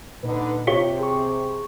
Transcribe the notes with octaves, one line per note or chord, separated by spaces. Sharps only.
A#2 D3 D#4 B4
C3 F4 G4 C#5
G#4 C#6